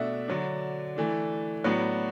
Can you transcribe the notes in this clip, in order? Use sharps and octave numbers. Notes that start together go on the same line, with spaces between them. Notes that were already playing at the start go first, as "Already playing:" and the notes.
Already playing: B2 A3 D4 E5 F#5
D3 F#3 D4
E3 A3 D4
A2 F#3 B3 D4 F#4